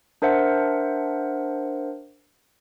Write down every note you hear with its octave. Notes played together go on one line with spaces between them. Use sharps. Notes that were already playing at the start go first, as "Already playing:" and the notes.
D4 A#4 C5 E5 F#5